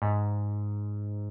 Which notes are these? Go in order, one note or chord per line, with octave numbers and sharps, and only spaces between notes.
G#2